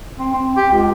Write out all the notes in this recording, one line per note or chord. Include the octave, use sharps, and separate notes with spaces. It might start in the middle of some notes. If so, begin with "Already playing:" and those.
C4
C4
G4
C#2